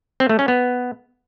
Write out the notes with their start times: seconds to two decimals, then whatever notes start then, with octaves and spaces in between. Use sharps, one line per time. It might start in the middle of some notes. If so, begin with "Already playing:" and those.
0.20 C4
0.29 A3
0.39 C#4
0.48 B3